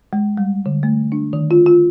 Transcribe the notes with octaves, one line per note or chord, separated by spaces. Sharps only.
G#3
G3
D3
A3
D4
D#3
F4
F4